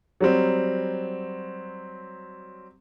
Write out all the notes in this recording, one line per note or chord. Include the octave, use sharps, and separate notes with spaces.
F#3 G3 C4